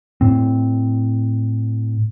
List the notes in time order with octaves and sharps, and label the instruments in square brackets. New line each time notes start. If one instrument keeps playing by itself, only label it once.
[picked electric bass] A2 C4